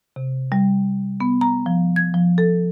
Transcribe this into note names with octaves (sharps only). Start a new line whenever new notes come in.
C3
G3
B3
A#5
F3
G#6
F3
A4